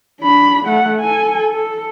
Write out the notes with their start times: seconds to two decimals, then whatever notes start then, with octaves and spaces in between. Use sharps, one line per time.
0.21 D4 B5
0.65 A3 F#5
1.00 A4 G#5
1.54 A4